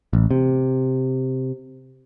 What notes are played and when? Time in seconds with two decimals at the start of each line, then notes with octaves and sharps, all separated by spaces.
0.13 A1
0.31 C3